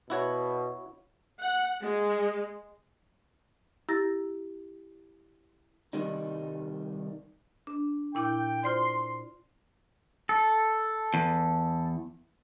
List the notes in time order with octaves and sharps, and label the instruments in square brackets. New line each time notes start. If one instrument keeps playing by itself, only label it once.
[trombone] B2 [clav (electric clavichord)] E4 F#4 C#5
[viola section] F#5
G#3
[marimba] E4 G4 A#5 E6 A6 A#6
[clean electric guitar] C2 D#3 G3 D#4
[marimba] D4
[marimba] A#2 E4 D6 [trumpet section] G5
[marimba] F4 C5 D5 [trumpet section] C6
[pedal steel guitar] A4
[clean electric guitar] E2